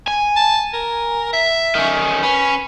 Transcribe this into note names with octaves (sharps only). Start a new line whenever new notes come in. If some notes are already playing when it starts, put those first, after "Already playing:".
G#5
A5
A#4
E5
D#3 C#4
C#4 B4